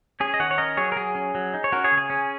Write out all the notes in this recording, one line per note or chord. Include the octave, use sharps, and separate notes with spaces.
C#4 G#4
D#5
D#3 C#5 F#5
C#5
C#4 A#4 D#5
F#3 G#4 C#5
A#4
F#3 G#4
C#4
F#3
D#4
C#5
C#4 F#4 A#4
G#4 C#5
C#3
G#4
C#4